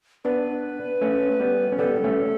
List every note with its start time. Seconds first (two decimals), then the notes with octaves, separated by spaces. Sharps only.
0.24 B3 D4 B4
1.01 A3 C#4
1.40 G3 B3
1.72 C#4
1.78 G3 B3 A4
2.04 A3 C#4